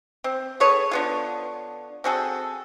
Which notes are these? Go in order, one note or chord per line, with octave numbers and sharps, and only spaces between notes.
C4
G#4 A4 B4 C#5
D3 B3 F4
C4 F#4 G#4 A4